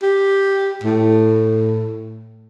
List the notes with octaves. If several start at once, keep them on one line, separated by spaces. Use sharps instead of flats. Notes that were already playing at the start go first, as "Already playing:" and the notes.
G4
A2